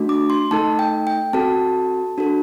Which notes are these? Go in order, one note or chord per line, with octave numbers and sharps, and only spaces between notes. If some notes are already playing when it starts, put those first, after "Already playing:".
Already playing: A3 D4 F#4
D6
C6
A3 D#4 A4 A5
G5
G5
C4 F#4 A4 A5
D4 F#4 A4